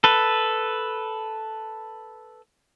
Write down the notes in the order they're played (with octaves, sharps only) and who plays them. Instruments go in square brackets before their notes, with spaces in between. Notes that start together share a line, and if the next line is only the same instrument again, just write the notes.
[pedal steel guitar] A4 B4